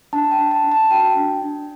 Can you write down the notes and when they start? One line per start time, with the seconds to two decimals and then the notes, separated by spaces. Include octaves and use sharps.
0.13 D4 A5
0.31 G5
0.38 D4
0.51 A5
0.64 D4
0.72 A5
0.91 F#4 G5
1.17 D4
1.42 D4